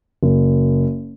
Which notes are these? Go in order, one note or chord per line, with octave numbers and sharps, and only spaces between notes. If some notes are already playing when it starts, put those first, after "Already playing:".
F#1